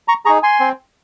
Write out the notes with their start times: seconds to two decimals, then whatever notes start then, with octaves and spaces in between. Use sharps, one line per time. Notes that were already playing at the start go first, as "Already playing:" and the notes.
0.08 A#5 C#6
0.25 G#4 A#5 C#6
0.29 D#4
0.43 G#5 C6
0.60 C4